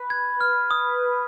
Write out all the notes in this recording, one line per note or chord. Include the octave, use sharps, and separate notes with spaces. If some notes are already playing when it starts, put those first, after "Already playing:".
Already playing: B4
G#6
F6
D#6